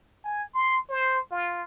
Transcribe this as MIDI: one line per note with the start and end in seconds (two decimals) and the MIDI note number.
0.24 0.43 80
0.54 0.78 84
0.89 1.19 72
1.31 1.62 65